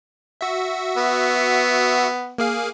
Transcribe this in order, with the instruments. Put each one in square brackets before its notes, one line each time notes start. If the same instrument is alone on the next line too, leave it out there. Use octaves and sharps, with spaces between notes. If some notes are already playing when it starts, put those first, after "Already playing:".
[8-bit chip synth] F#4 E5
[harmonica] B3
[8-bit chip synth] A#3 G#4 F5